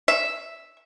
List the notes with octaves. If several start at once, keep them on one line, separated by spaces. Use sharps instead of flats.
E5